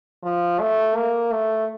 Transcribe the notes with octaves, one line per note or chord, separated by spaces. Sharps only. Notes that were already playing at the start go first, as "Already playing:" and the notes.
F3
A3
A#3
A3